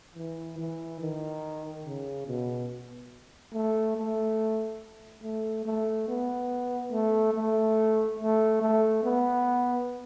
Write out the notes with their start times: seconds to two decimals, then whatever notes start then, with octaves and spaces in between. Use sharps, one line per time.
0.15 E3
0.58 E3
1.00 D#3
1.85 C#3
2.27 B2
3.53 A3
3.96 A3
5.23 A3
5.65 A3
6.08 B3
6.92 A3
7.34 A3
8.19 A3
8.61 A3
9.03 B3